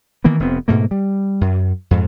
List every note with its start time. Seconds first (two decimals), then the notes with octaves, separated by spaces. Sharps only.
0.24 D#3 E3 A#3 B3
0.40 F1 B3 C4
0.68 G#2 B2 A3 A#3
0.91 G3
1.41 F#2
1.91 F2 G#2